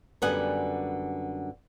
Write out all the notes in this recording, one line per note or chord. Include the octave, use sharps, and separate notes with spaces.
F#2 D3 G3 B3 F#5 G#5